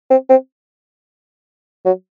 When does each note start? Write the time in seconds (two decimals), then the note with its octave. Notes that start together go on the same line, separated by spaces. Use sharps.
0.10 C4
0.30 C4
1.86 F#3